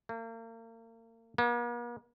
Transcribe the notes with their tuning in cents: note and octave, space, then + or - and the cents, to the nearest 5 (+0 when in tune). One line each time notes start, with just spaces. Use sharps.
A#3 -40
A#3 +45